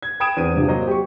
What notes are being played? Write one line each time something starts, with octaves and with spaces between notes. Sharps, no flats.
G#6
G5 B5 D#6 G#6 D7 E7
E2 C4 D#7
G2 C3 F3
F#3 A#3 C5 D#5
G4 C#6